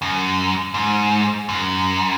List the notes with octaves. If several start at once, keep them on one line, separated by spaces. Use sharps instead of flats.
F#2
G#2
F#2